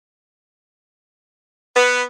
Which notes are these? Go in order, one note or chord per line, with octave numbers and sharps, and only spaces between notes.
B3